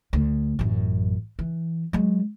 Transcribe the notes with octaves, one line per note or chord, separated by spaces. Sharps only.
D2
A1 F#2
E3
F#3 G#3